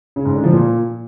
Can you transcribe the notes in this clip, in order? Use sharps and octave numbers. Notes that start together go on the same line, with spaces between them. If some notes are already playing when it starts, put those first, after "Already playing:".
C#3
G#2
D3
F3
A#2